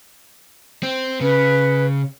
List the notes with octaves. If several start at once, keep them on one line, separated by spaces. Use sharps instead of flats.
C4
C#3 B4